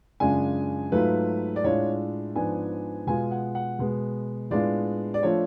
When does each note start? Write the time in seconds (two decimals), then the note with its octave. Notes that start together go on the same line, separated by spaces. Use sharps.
0.20 F#2 C#3 G#3 D4 F4 G#5
0.92 G#2 F#3 A3 F4 B4
1.56 D5
1.64 A2 G#3 D4 F4 C#5
2.35 G#2 F3 B3 D4 G#5
3.07 B2 G#3 B3 F4 G#5
3.31 F#5
3.55 F#5
3.79 B2 G#3 B3
4.50 A2 G#3 B3 D4 F4 D5
5.14 D5
5.23 F3 A3 D4 F4 C#5